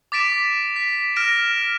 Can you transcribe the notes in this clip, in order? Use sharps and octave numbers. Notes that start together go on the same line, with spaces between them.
D6 A6 B6 D7 E7
B6
F6 A#6 D7 E7